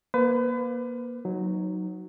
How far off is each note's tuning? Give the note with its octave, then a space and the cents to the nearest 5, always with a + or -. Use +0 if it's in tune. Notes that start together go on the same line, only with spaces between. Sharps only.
A#3 +30 B4 +35
F#3 +0 D#4 +0